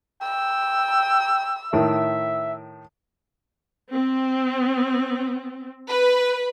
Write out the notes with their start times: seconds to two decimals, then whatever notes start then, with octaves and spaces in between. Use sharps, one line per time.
0.22 G5 E6
1.73 A2 D#3 E5
3.91 C4
5.88 B4